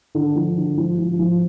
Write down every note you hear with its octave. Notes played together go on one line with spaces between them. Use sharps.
D3
F3
D3
F3
F3
F3